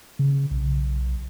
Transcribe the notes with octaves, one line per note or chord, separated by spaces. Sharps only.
C#3
B1